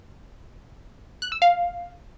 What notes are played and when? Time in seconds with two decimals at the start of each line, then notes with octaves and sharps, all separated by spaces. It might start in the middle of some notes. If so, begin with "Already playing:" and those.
1.22 F#6
1.32 E6
1.42 F5